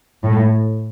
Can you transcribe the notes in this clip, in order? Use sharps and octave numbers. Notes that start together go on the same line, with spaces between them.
A2